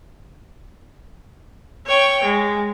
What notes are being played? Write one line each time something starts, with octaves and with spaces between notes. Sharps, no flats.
C#5 G5
G#3